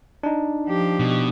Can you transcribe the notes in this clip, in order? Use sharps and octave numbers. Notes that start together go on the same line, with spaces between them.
D4 D#4
F3 G4
B2